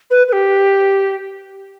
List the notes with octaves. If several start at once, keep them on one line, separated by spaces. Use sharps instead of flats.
B4
B4
G4